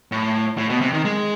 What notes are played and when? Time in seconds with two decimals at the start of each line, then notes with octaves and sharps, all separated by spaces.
0.12 A2
0.58 A2
0.70 B2
0.81 C3
0.93 D#3
1.05 G#3